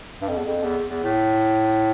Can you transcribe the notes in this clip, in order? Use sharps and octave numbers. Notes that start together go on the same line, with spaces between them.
G2
F2
E2
F2
E2
E2
A2